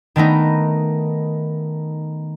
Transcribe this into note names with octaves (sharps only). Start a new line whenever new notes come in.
D#3 A3 B3 D#4